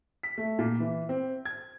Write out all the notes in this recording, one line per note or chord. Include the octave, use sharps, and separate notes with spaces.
B6
A3
A#2
E3
C4
G#6